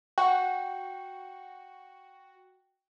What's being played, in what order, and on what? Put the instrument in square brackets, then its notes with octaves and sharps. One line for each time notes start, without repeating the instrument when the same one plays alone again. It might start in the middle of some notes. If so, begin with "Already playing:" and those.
[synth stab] F#4 [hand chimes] G5